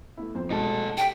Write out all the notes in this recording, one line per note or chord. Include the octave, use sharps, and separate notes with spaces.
A3 B3 E4
F2 C4 C5
B2 G#3 A3 D#4 A4
G4 G5 B6